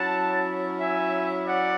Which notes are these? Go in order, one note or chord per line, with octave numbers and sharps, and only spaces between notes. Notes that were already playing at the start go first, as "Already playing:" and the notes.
Already playing: F#3 C#4 E4 F#5 A5
E5 G#5
D5 F#5